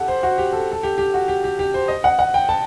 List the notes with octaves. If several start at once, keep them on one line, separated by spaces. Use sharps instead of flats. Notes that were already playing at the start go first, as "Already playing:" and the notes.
Already playing: G4 A4 F#5
C5
F#4
G4
A4
A4
G4
G4
F#4
G4
G4
G4
C5
D#5
F#5
F#5
G5
A5